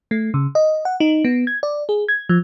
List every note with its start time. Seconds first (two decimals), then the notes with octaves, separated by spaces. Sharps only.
0.11 A3
0.34 C#3
0.55 D#5
0.85 F#5
1.00 D#4
1.24 B3
1.47 G#6
1.63 D5
1.89 G#4
2.09 G#6
2.29 F3